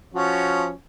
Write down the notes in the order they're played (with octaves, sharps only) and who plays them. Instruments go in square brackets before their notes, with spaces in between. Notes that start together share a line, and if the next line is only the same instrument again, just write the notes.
[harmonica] F3 C#4 F#4